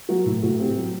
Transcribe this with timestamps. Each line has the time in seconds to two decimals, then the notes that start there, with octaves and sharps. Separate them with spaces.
0.09 F#3 F#4
0.26 A2 E4
0.43 A2 F#4
0.59 C4 G4
0.77 F#3